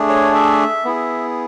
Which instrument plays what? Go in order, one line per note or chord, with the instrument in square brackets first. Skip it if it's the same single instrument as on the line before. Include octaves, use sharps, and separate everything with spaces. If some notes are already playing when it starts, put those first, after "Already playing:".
Already playing: [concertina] A3 D4 G#4
C#5
E5
B3 E4 G#4